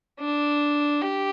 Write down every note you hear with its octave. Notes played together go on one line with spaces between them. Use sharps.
D4
G4